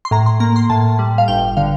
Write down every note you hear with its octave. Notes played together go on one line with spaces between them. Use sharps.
C6
A2 A#5
C6
A#3 A#5
C6
A2 A5
G3
F5
G1 G5
D3 F5